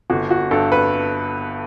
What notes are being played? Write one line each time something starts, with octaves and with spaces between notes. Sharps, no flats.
G1 F#4
F#4
G2 A4
B4